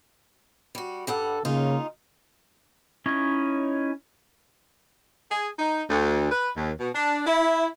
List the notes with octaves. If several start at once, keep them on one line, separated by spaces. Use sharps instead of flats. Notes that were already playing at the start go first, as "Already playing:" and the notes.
G3 F#4
G2 G3 A4 F#5
C#3 G#3 A#3 D#4 F4
C#4 D#4 E4 C#5 D#5
G#4
D#4
D2
B4
D#2
B2
D4
E4